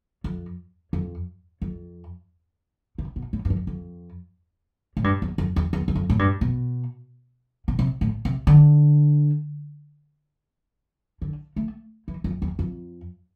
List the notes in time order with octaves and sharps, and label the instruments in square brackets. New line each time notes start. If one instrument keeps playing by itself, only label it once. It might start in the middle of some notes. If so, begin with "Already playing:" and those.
[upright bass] F2
F2
F2
C3
B2
A2
G2
F2
F2
A2
G2
E2
F2
E2
E2
E2
F2
A2
G2
B2
B2
C3
A2
C3
D3
D3
A3
E3
F2
E2
F2